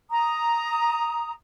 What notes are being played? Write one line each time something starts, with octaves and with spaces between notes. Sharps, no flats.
A#5 D#6